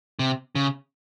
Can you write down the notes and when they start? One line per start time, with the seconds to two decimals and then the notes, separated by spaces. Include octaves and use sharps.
0.19 C3
0.55 C#3